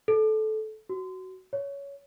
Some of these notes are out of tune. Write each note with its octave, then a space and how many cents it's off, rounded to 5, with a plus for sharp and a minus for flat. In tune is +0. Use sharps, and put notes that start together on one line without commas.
A4 -20
F#4 +15
C#5 +15